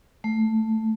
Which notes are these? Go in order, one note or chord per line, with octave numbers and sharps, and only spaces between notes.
A3